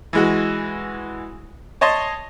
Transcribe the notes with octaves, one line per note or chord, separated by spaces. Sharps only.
E3 G#3 F#4
C#5 D#5 A5 C6